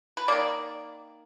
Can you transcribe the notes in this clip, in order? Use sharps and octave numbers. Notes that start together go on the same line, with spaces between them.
B4
D#3 A#3 D5